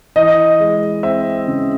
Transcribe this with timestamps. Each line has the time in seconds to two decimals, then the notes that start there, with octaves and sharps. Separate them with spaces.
0.16 E3 D#5
0.60 G#3
1.03 C4 E5
1.47 C#3